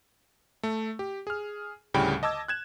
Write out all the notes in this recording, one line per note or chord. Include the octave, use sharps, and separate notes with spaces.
A3
G4
G#4 F6
D2 A2 C#3 G3 G5 B5
D#5 A5 D6 E6 G#6
F#6 G#6 E7